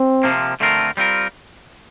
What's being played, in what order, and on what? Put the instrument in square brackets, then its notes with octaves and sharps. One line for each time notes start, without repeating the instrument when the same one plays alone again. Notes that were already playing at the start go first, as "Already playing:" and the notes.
Already playing: [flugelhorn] C4
[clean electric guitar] C3 F3 A#3
D3 A3 C4 F4 A#4
G3 C4 F4 A#4